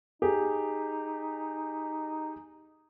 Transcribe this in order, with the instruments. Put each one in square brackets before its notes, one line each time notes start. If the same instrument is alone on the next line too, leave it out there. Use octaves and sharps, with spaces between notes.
[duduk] D#4 [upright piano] G4 G#4